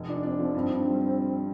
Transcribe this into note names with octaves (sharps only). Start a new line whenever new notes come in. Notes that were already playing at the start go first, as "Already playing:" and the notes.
Already playing: F1
D4 F4
C4 D4
F3 C4
G2 C4
G2
G3